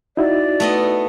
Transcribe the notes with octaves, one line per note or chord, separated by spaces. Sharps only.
D#4 E4 F#4 D5
A3 B3 D#5